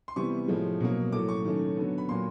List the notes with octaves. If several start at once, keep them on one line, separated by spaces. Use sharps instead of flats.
C6
C3 E3 G3 B3 C#6
A2 F3 G#3
B2 F#3 A#3
A2 F#3 A3 D6
C#6
D#3 F#3 A3 C#4
D3 F#3 B3
B5
A#2 F#3 A#3 C6